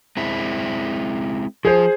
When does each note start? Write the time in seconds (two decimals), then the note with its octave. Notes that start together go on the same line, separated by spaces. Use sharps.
0.17 G#3 C4 E4
1.65 F3 G#4 C5